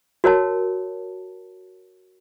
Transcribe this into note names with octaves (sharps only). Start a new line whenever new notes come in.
F#4 A#4 C#5 A5